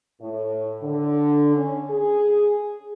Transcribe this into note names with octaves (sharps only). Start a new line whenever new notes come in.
A2
D3
C#4
G#4